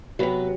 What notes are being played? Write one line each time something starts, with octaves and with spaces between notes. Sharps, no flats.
C3 F#3 B3 B4